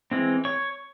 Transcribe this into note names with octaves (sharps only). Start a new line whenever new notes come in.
E3 G#3 C4
C#5 C#6